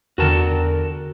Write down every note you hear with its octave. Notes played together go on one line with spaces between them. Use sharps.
E2 D3 F#4 A#4 A5